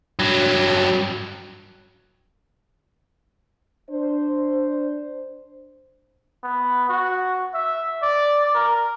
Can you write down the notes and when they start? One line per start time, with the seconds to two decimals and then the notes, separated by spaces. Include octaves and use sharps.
0.19 G2 F#3
3.90 D4 C5
6.43 B3
6.89 F#4
7.54 E5
8.02 D5
8.55 A#4